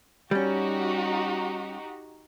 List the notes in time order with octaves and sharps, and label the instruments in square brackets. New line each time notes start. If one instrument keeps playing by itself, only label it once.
[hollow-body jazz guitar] G3 C#4 [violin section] D#4 F#4 G4